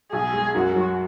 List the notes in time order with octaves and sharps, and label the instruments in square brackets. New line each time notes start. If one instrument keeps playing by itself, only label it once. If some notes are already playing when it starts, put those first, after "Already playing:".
[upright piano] B1 [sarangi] G#4
[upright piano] G#3
[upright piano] F#2 [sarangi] F#4
[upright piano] F#3